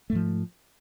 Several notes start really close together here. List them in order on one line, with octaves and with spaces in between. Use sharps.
A3 G#2 F3